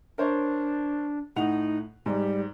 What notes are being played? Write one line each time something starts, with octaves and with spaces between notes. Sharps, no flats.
D4 A#4 C5 C#5
A2 D#4 F#5 F7
G#2 G3